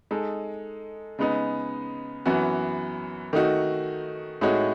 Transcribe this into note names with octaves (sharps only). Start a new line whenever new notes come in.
G#3 D#4 A4
C#3 G#3 B3 D#4
F#2 E3 B3 F#4
D#3 A3 D#4 F#4
A2 G#3 D#4 F#4 C#5